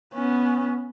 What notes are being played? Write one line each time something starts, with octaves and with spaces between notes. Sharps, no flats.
B3 C#4